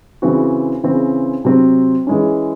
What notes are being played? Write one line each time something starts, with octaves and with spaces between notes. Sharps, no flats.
C#3 E3 C4 F#4
C#3 E3 C4
C3 F#3 C4
E3 G#3 C#4